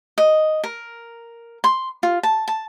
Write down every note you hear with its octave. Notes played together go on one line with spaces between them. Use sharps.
D#5
A#4
C6
F4
A5
A5